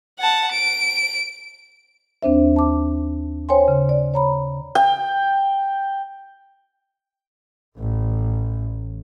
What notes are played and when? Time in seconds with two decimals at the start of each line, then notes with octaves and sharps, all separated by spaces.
0.19 F#5 A5
0.52 D7
2.23 D#2 C4 D4 C5 E5
2.56 A5 D6
3.49 C5 C#5 G5 G#5 C6
3.68 C#3
3.89 D5
4.14 C#5 A#5 B5
4.75 G5
7.76 A1